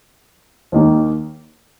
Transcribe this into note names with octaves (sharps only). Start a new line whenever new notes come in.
D#2 D#3 A#3